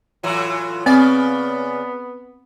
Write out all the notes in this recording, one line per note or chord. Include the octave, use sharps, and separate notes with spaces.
A2 E3 F#3 F4
C#3 B3 C4 D5